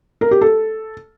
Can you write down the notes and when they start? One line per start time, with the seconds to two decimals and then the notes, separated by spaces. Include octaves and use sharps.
0.21 A#4
0.31 G4
0.41 A4